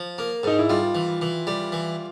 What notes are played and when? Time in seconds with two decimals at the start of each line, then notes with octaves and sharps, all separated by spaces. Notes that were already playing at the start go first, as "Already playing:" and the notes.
Already playing: F3
0.18 A#3
0.43 G#2 D#4
0.59 E4
0.70 G3 F4
0.95 E3
1.22 E3
1.47 G3
1.72 E3